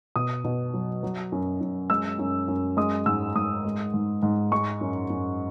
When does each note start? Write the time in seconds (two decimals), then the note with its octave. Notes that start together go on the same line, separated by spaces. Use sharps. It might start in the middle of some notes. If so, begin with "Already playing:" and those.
0.16 B2 D#6
0.45 B2
0.74 F#3
1.03 F#3
1.32 F#2
1.61 F#2
1.90 G#3 E6
2.19 F#2
2.48 F#2
2.77 G#3 D#6
3.06 G#2 E6
3.35 G#2 D#6
3.65 G#3
3.94 G#2
4.23 G#2
4.52 G#3 C#6
4.81 F#2
5.10 F#2